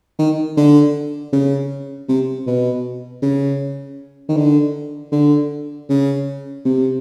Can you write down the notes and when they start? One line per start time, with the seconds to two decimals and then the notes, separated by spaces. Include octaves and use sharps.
0.19 D#3
0.57 D3
1.33 C#3
2.09 C3
2.47 B2
3.22 C#3
4.29 D#3
4.37 D3
5.12 D3
5.89 C#3
6.65 C3